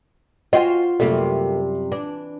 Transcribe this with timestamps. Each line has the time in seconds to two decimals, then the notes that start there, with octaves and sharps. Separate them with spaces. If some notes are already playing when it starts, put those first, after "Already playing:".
0.53 F4 F#4 C5 D#5 G5 G#5
1.00 F#2 C3 G3 A3 A#3
1.92 E3 D4